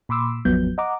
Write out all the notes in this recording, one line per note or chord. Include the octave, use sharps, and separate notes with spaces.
A#2 B5 C6 D6 E6
G#1 E2 F3 F#3 B3 G6
D#5 F#5 A#5 D6